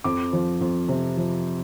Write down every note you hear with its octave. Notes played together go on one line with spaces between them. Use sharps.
F2 D6
F3
F2
C3
F3